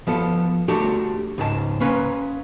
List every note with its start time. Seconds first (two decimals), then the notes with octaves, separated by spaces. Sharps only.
0.07 F3 B3 A4
0.68 A3 D4 F#4 G4 A4
1.38 C#2 G#2 A5
1.80 A#3 C#4 B4